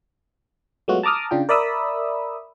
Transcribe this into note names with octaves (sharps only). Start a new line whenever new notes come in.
F#3 G#3 A3 B3 F4 F#4
A5 A#5 D6 D#6 F6
C#3 D4 F4 G5
A#4 D5 E5 B5 D#6 E6